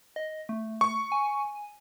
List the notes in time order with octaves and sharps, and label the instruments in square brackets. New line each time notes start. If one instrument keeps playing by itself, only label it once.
[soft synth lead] D#5
A3
[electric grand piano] C#6
[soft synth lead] G#5